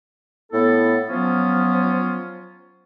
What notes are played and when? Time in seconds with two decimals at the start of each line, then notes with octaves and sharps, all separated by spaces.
0.52 A2 B3 E4 A4
1.09 F3 F#3 B3 C#4 F4